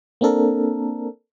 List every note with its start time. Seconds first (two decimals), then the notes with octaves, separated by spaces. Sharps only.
0.21 A#3 C4 D4 A4 A#4